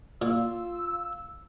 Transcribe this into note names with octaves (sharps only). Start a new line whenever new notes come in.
A#2 F4 E6